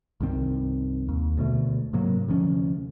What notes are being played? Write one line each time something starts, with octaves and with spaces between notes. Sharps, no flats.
C2 G2 D#3 C4
D#2
D2 B2 A3
G#2 C3 F#3 A#3
D2 C3 F3 C#4